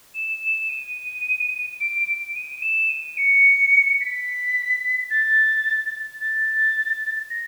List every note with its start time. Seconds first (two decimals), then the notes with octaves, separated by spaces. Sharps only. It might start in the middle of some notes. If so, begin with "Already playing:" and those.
0.15 E7
0.43 E7
0.69 D#7
1.81 D7
2.08 D7
2.35 D#7
2.62 E7
2.90 D#7
3.18 C#7
4.01 B6
5.11 A6
6.21 A6
7.30 A#6